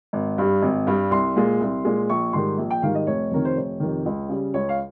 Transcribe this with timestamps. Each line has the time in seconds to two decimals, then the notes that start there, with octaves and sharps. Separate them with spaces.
0.13 G#1
0.38 G2 G3
0.62 G#1
0.87 G2 G3
1.11 C2 C6
1.36 A#2 G#3
1.61 C2
1.85 A#2 G#3
2.09 A#1 C#6
2.33 G#2 D#3 G3 C6
2.58 A#1
2.70 G5
2.82 G#2 D#3 G3 F5
2.95 D#5
3.07 F1 C#5
3.31 F2 C3 D#3 A#4
3.45 C5
3.57 F1 C#5
3.80 F2 C3 D#3
4.06 C#2
4.29 C#3 G3
4.54 C#2 C#5
4.69 F5